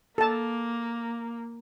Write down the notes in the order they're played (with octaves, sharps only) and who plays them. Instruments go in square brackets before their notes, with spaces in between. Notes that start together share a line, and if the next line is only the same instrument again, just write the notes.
[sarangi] A#3 [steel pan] A4 A5